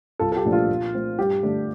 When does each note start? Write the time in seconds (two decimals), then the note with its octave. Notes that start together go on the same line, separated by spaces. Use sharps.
0.19 C2 F4 A4
0.32 A4
0.36 G4
0.45 A#2 F3 A3 D4
0.52 F4
0.69 A#2
0.94 A3 C4
1.19 G2 G4
1.43 D3 A3 D4